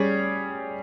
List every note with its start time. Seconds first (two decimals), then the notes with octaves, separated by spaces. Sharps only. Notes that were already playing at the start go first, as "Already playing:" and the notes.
Already playing: G3 C#4 G#4